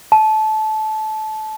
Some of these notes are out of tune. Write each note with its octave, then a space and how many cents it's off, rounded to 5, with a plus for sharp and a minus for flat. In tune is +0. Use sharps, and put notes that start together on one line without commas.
A5 -20